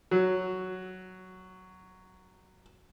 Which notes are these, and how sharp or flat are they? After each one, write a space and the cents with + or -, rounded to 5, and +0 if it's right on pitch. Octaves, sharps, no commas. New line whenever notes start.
F#3 +5